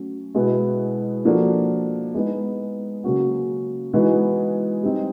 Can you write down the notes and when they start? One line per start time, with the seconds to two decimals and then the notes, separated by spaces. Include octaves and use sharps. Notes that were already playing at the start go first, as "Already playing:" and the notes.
Already playing: F#3 A3 C#4
0.35 B2 G#3 B3 E4 G#4
1.25 F3 A#3 D4 F#4 A4
2.14 G#3 B3 D#4
3.04 C#3 F#3 A#3 C#4 F#4
3.93 E3 G#3 B3 D#4 F#4
4.83 G3 C4 D#4